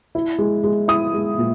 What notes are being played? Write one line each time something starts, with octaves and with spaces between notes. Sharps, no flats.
E4
G#3
G#3
E4 D#6
G#3
A#2